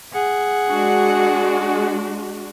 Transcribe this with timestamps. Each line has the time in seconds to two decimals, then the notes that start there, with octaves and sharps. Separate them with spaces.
0.13 G#4 F#5
0.70 G#3 D4 F#4